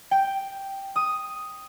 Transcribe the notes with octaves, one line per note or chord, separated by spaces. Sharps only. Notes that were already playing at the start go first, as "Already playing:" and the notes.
G5
D#6